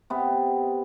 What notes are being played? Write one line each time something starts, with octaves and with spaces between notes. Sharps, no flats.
C3 B3